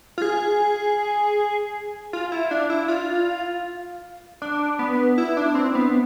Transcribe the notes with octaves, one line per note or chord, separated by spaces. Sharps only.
F4
G#4
F4
E4
D4
E4
F4
D4
B3
E4
D4
C4
B3